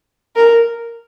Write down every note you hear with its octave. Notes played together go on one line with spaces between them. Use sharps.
A#4